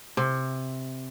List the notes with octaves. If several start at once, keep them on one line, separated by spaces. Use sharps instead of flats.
C3